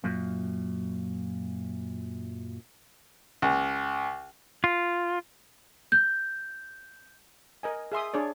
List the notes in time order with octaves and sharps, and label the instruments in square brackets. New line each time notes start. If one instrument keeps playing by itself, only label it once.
[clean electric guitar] F#2 A#2
[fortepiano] C#2
[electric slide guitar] F4
[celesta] G6
[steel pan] A#4 D#5 G#5
G#4 E5 C6 D#6
D4 G#4 C#5 D5